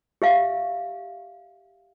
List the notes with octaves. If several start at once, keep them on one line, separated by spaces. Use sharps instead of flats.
G4 E5 F5